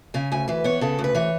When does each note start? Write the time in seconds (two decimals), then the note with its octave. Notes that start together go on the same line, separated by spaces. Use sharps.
0.14 C#3 G#5
0.32 D2 G#5
0.48 E3 B4
0.64 B3 C#5
0.81 C#3 A4
0.99 D2
1.04 B4
1.15 E3 C#5